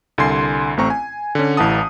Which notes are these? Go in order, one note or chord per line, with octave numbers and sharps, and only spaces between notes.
C2 D3 G#5 C6 C7
A1 A3 C4 A#5 C#6
G#5
D3 C#4
A1 E3 F#5 A5 D#6